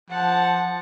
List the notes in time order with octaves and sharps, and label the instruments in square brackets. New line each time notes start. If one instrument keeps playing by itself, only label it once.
[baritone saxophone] F3 [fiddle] F#5 A5